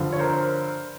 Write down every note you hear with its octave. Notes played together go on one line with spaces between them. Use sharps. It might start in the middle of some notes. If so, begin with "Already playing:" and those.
Already playing: G2 D3 F3
C#5
A#4 C5